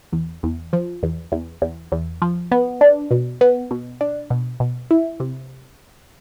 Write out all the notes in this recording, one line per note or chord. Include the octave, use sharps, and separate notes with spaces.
E2
E2
F3
E2
E2
E2
E2
F3
B3
D4
B2
B3
B2
D4
B2
B2
E4
C3